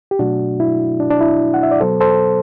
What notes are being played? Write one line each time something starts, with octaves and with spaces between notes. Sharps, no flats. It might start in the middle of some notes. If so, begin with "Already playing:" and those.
G4
B2 F#3 A3 D4 F#4
E4
D4
D4
E4
F#5
E5
D5
B2 F#3 B3 A4 C5
A4 C5